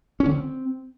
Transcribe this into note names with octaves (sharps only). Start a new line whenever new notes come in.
C#4
D3
C4